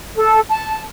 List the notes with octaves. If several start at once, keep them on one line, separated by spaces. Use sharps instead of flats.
A4
A5